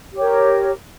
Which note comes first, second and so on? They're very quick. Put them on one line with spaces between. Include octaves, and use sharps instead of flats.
G4 C#5 A#4